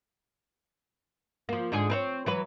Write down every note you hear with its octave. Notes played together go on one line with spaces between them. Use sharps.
F3 A#3
G#2 D3 G#4
C4 B4 C#5
E3 F#3 B4